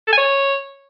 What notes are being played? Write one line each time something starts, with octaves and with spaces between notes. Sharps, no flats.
A4
G#5
C#5